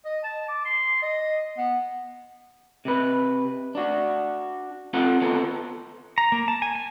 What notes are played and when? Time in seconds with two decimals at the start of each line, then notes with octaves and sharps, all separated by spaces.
0.05 D#5
0.24 A5
0.48 D6
0.65 C6
1.03 D#5
1.58 B3
2.85 C3 B4
3.75 D4 F#4
4.93 C4 F4 A4 F#5
5.21 B3 F4 A4 C5
6.18 A#5
6.32 A#3
6.48 A5
6.62 G#5
6.75 G#5